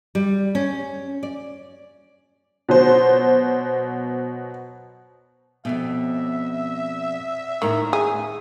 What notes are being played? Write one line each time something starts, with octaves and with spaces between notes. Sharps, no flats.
G3
C#4
D5
B2 F#3 C5
F2 G#2 B2 E5
D#2 A2 D#3 A#5
G#4